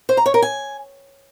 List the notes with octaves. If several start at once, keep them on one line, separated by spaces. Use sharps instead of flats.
C5
A#5
C#5
A#4
G#5